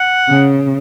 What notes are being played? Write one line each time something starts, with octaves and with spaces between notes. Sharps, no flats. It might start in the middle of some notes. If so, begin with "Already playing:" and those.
Already playing: F#5
C#3